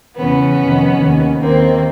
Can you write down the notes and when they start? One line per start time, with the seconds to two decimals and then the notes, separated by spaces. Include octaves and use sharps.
0.17 E2 C#3 E3 B3 C#4
0.59 F2 C3 D#3
0.99 D#2 D#3
1.40 D#2 D#3 A#3 C4